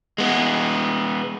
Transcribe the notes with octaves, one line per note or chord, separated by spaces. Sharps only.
G#3 B3